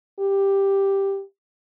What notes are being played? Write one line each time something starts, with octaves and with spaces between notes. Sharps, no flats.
G4